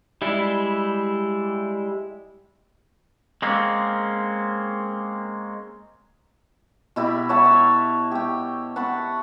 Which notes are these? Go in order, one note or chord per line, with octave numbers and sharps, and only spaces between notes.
G3 G#3 E4
G#3 A#3 C4 C#4
B2 E4 G4 B5
C#5 F#5 A5 B5
E5
G4 G5
F#5 A5 B5 C#6